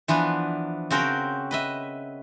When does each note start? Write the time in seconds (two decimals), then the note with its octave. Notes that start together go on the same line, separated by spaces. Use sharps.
0.08 E3 F3 B3 D4
0.91 C#3 C4 F#4 A#4 C5 G5
1.51 B4 D#5 E5